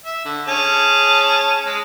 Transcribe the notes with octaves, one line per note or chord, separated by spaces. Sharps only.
E5
D3
C#4 G#4 A5
G#3